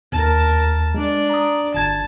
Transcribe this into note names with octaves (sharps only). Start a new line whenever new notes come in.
D#2 A#4 A5
G#3 D4 D5
A#5 D#6
G1 A5 G#6